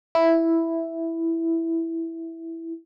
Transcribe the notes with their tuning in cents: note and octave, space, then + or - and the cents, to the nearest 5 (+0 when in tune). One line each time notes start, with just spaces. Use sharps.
E4 +0